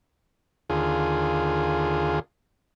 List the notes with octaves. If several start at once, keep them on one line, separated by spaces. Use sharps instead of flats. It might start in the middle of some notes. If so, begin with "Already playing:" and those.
D#2 D3 F4 G#4